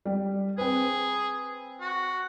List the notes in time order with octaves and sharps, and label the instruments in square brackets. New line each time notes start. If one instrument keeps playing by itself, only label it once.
[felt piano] G3
[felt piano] C4 B4 [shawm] G#4
[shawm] F#4